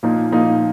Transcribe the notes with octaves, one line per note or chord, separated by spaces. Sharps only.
A#2 F3 A#3 D#4
A#2 F3 A#3 D#4